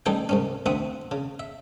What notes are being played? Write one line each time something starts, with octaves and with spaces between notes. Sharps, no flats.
A1 G3 D#4 G#4 A4 G5
C2 G#2 C#4
D2 C4 E5 F#5 D#6
C#3
E5